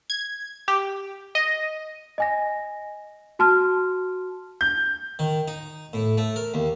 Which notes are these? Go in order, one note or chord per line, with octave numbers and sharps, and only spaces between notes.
G#6
G4
D#5
D#5 G#5 A#6
F#4 A5 C6 F6
G6
D#3
D#4
A2
A3
A#4
D#2